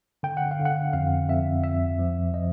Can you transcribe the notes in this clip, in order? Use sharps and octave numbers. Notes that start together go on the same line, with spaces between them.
D3 G5
F#5
F5
D3
F#5
F2 F5
F2 E5
F2 E5
F3
F3 D#5